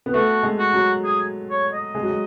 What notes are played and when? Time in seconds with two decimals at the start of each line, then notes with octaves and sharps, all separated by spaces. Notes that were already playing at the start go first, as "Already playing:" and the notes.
0.06 B3
0.13 A3 F#4
0.43 G#3
0.59 F#4
0.73 F#3
1.04 G#4
1.50 C#5
1.73 D#5
1.95 G#3
2.02 F#3
2.10 G#3